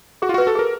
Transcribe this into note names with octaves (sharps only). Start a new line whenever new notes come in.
F#4 G#4
F4
F#4 B4
A4
G#4 A#4